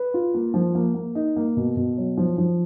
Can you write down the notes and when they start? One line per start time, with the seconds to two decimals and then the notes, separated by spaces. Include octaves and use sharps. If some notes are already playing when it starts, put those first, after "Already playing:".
Already playing: B4
0.14 F4
0.34 A#3
0.54 F3
0.75 A#3
0.94 A#3
1.15 D#4
1.36 A#3
1.57 B2
1.77 B2
1.98 F#3
2.17 F3
2.38 F3